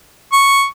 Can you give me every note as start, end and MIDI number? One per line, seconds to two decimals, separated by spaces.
0.33 0.65 85